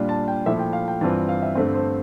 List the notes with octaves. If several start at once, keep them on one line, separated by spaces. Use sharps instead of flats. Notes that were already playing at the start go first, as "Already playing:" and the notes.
Already playing: A#2 G3 D4 F4
A5
G5
A#2 F3 A3 E4 E5
G5
F5
G5
G2 E3 G3 C4 F4 A5
F5
E5
G2 D3 A3 C4 C5
C5